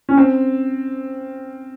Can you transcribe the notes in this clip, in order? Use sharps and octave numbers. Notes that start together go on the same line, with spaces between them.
C#4
C4